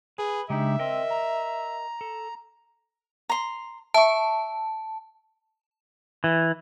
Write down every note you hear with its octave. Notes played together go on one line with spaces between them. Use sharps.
G#4 B4
C#3 G#3 D4 D#4 G4 E5
C4 A#4 D#5
A#5
A4
A#5 C6
E5 A5 C#6
E3